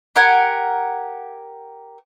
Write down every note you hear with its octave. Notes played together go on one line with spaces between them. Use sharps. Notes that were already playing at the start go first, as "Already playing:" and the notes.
G4 A#4 F#5 G#5